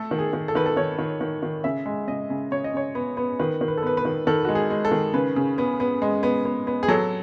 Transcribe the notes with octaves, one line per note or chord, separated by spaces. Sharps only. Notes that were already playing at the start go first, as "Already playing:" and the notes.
Already playing: A3 A4
D#3
G#4
D#3
A4
D#3 B4
A4
D#3 C#5
D#3
D#3
D#3
C#3 E5
G#3
C#3 D#5
C#3
C#3 C#5
D#5
C#3 C#5
B3
B3
D#3 B4
D#3
B4
A4
B3 B4
B4
D#3
D#3 A4
G#3 F#4
G#4
G#3
A4
D#3
C#3 B4
C#3
B3
B3
G#3
B3
B3
B3
G#4
F#3 A4